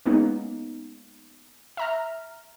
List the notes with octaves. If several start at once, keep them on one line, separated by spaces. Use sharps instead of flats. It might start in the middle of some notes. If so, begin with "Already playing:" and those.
G#3 A#3 B3 C#4 D#4
E5 A#5 F6